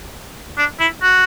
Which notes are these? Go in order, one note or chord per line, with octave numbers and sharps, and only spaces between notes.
D4
E4
F#4